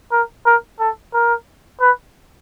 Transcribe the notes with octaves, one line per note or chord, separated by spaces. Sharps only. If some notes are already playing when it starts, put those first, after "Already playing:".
A#4
A#4
A4
A#4
B4